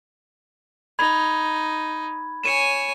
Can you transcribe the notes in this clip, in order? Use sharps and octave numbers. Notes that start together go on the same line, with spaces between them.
D#4 B5 G#6
C#5 G#5 C#7 D#7 E7